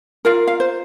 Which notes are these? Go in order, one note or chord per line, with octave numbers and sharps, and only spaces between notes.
F4 A#4 F5
F5
C5